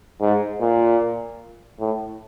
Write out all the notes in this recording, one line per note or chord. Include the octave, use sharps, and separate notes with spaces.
G#2
A#2
A2